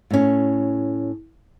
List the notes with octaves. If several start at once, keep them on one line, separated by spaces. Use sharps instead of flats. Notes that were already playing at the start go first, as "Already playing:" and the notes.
A2 C#4